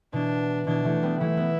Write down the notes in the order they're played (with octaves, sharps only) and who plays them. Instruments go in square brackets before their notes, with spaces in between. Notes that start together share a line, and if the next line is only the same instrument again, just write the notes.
[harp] B2 E3 [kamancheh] D4
[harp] B2 E3 [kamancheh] D4
[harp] E3 A3
G3 B3
[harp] E3 A3 [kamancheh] E4
[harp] B3